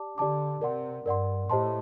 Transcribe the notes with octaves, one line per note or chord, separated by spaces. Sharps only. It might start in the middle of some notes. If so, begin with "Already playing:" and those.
Already playing: G4 D5 A5 D6
D3 G4 D5 A5 D6
C3 A#4 D5 F#5 C6
G2 A#4 D5 F#5 C6
A2 G4 C5 D#5 A5 C6